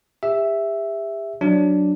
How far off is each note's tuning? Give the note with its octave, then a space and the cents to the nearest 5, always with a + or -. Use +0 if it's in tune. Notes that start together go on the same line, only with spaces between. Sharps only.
G4 +40 E5 +0
F#3 +0 D4 +0